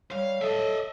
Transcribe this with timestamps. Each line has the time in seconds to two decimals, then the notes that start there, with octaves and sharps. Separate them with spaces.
0.12 G3 C#5 F5
0.41 A4 D#5 E5